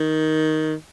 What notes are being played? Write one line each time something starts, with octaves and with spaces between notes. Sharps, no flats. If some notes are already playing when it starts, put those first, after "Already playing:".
Already playing: D#3